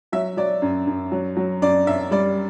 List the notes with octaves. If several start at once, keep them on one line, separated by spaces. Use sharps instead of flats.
F#3 E5
F#3 D5
F#2
F#2
F#3
F#3
F#2 D5
F#2 E5
G3 D5